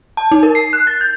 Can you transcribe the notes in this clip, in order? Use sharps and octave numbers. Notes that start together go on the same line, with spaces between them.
A5
D#4
A#4
C7
F#6
A6
G6